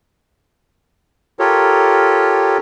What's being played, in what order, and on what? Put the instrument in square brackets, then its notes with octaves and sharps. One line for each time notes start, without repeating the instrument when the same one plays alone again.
[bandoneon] F4 G4 A4 A#4 C#5